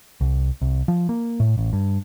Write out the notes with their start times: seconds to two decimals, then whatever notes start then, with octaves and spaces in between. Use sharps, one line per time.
0.21 C2
0.61 C2
0.88 F3
1.09 A#3
1.40 A2
1.58 A1
1.73 G2